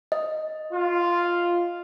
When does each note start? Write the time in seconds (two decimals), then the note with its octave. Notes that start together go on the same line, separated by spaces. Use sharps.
0.12 D#5
0.72 F4